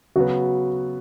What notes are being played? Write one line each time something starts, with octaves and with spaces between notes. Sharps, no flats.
C#3 F#3 B3 F#4